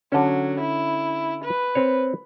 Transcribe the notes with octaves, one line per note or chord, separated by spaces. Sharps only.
D3 F#3 C#4
E4
B4
C4 C5 C#5